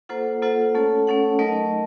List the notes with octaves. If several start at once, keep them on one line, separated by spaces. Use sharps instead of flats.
A#3 F4 A4 C5 F#5
A#3 F4 A4 C5 F#5
A3 C#4 A4 C#5 F#5
A3 C#4 A4 C#5 F#5
F#3 A3 D#4 A#4 D#5